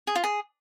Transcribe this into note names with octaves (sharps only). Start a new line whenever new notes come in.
G#4
F4
G#4